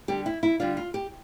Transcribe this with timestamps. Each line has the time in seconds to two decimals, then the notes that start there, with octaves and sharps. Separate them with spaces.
0.08 D3 G3 D4 G4
0.26 E4
0.43 E4
0.60 D3 G3 D4 F4
0.77 F4
0.94 G4